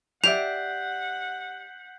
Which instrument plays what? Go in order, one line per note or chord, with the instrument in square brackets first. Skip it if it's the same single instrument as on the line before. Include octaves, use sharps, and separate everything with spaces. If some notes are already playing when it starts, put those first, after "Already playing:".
[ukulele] G4 D5 E5 [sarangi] F#5 [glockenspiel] G6 B6 C7 [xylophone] F7